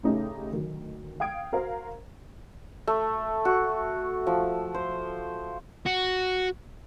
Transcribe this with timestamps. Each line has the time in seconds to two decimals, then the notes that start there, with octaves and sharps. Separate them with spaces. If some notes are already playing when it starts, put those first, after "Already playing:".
0.03 A2 C#3 A3 C#4 D#4 G4
0.52 D2 D#3 F#3
1.20 F5 G5 D#6 G#6 D7
1.52 F#4 A#4 C5 F5 A#5
2.87 A3
3.45 F#4
4.27 F3
4.74 C5
5.86 F#4